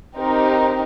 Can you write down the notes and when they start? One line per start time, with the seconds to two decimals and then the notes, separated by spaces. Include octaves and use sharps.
0.17 C4 D#4 G4 A#4